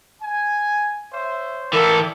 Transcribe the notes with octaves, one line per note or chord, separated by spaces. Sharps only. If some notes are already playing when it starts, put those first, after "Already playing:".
G#5
C5 C#5 E5
E3 A4 A#4 D5 E5 G5